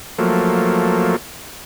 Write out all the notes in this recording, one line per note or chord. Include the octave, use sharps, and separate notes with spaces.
F3 F#3 A3 A#3